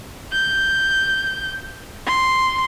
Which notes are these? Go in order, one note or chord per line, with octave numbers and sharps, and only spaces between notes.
G6
C6